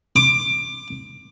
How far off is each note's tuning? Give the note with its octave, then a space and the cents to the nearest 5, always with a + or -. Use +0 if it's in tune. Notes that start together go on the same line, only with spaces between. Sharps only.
D6 +20